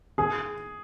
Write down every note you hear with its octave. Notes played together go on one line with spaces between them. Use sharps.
G#4